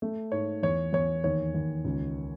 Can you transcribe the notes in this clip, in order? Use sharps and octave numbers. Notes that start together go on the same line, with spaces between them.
A3
G#2 C#5
E2 C#5
E2 C#5
D#2 C#5
D#2
C#2